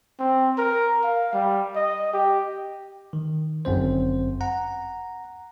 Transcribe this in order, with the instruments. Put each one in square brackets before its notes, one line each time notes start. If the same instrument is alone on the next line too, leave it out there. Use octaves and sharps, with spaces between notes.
[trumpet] C4
A#4
F5
G3
D#5
G4
[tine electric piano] D#3
G1 F#2 C4 C5
F#5 A#5